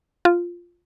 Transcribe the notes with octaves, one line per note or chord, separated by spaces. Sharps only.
F4